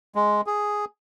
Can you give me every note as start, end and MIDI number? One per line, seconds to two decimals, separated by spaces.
0.15 0.41 56
0.47 0.85 68